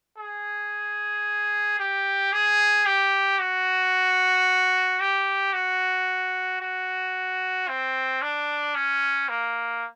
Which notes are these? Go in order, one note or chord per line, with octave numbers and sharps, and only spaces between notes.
G#4
G4
G#4
G4
F#4
G4
F#4
F#4
C4
D4
C#4
A#3